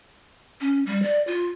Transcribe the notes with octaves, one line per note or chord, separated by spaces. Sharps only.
C#4
G3
D5
F4